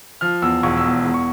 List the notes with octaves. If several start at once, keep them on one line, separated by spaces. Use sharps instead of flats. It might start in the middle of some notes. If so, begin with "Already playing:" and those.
F3 F6
E2 E6
E1 C#6
E6
E2
E2
C#6